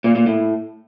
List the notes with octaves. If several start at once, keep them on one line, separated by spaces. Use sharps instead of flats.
A#2
A#2
A2